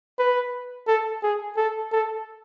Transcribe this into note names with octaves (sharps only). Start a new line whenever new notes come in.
B4
A4
G#4
A4
A4